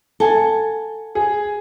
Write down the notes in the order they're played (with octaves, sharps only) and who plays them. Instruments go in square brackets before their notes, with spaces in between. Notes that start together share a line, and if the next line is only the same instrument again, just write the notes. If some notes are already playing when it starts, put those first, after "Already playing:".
[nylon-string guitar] A4 F#5 G#5
[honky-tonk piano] G#4